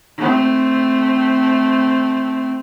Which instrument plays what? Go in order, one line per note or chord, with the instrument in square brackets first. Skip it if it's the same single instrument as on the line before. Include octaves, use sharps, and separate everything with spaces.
[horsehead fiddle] A3 C4